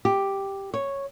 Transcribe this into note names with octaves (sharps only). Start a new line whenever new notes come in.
G4
C#5